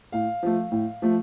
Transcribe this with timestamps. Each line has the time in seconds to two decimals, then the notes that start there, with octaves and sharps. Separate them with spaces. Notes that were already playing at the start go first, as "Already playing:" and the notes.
0.12 A2 F5
0.43 F3 A3
0.72 A2
1.02 F3 A3